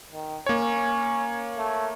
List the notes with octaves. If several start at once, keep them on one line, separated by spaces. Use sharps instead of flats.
D#3
A#3 C#4 C#5
A3